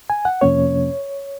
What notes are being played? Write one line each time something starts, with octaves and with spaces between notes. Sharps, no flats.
G#5
F#5
F2 C3 F3 A#3 C#4 C#5